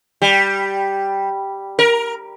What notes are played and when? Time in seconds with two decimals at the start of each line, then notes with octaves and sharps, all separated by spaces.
0.22 G3
1.79 A#4